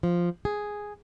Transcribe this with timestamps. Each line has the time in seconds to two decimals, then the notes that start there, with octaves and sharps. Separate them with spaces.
0.03 F3
0.45 G#4